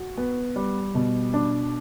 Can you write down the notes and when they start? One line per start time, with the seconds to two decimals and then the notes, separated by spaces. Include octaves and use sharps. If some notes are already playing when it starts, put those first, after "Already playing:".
Already playing: F#4
0.17 B3
0.56 G3
0.95 B2
1.33 D4